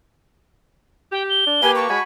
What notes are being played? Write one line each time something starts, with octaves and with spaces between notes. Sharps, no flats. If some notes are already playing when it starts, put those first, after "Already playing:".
G4 G5
G7
D4
A#3 G4 B4 G#5
A5 C#6
G#3 F#4 G#5 B5